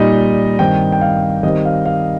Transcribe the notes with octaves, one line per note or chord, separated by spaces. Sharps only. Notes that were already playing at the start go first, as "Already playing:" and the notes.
Already playing: A#2 G3 D#4 D#5
G2 D#3 C4 G5
G5
F5
D#3 G3 C4 D#5
F5
F5